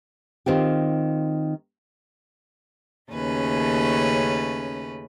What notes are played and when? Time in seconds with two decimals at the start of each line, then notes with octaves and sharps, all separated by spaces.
0.46 D#3 C4 F4 G4
3.11 D#2 C#3 A3 C#4 B4